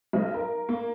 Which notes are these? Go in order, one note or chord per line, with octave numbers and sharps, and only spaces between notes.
B1
A#4
A#3